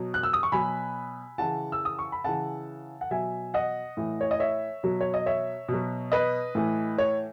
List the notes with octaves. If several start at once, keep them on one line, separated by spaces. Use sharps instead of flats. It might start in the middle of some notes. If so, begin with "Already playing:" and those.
Already playing: B2 F#3
F#6
E6
D#6
C#6
B2 F#3 G#5 B5
C#3 E3 F#5 A5
E6
D#6
C#6
B5
C#3 E3 F#5 A5
F#5
B2 F#3 E5 G#5
D#5 F#5
A2 E3
C#5
D#5
C#5 E5
B2 F#3
C#5
D#5
C#5 E5
B2 F#3
B4 D#5
A2 E3
C#5